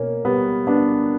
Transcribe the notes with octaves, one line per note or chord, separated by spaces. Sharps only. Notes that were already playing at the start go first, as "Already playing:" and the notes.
Already playing: B2 A#3 C#4
B2 G3 B3
B3 D4